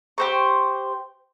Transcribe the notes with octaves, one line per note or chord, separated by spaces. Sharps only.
G4 C5 C#6